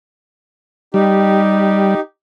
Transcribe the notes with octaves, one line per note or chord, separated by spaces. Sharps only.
G3 D#4 G4